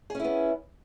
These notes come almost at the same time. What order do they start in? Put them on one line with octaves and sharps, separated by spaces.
G#4 C#4 E4 B3